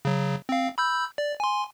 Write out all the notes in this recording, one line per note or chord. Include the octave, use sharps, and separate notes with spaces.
C#3 F#3
C4 F5
B5 E6 G6
D5
G#5 C6